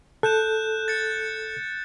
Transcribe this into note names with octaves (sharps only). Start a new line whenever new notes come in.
A4 F#6 G6 E7
A6 C#7